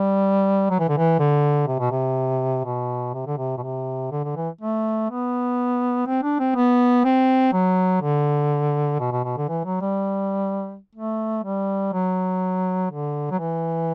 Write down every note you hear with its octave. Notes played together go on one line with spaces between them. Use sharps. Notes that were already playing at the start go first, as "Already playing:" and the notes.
Already playing: G3
F#3
E3
D3
E3
D3
C3
B2
C3
B2
C3
D3
C3
B2
C3
D3
D3
E3
A3
B3
C4
D4
C4
B3
C4
F#3
D3
B2
B2
B2
D3
E3
F#3
G3
A3
G3
F#3
D3
F#3
E3